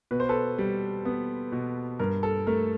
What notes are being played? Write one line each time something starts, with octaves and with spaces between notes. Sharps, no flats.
B2 B4
C5
A4 B4
G3
B3
B2
G2 A#4
A4
A3 A#4